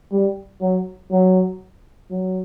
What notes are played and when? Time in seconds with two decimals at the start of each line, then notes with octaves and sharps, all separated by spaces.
0.12 G3
0.61 F#3
1.11 F#3
2.11 F#3